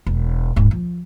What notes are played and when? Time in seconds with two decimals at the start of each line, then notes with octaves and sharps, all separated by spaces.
0.06 E1
0.56 D1 G#2
0.71 F3